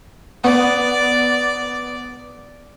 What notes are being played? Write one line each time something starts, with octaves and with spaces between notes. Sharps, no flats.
B3 D5